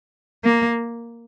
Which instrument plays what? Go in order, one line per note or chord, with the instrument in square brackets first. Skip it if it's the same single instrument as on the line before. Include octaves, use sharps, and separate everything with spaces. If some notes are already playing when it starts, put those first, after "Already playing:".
[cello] A#3